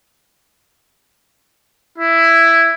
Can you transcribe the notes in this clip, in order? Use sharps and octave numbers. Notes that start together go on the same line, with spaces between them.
E4